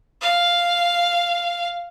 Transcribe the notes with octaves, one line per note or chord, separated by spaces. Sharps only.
F5